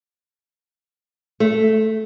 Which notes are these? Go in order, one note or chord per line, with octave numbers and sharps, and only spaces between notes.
A3